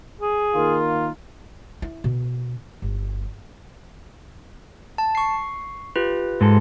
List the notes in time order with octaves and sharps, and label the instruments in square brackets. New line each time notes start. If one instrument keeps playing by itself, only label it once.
[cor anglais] G#4
[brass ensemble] D#3 A#3 F4
[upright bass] E4
B2
G1
[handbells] A5
C#6 C7
F4 G4 B4
[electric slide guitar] G#2 G#3 A4